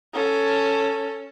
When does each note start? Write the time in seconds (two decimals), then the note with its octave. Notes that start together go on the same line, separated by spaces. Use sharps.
0.14 C#4 A4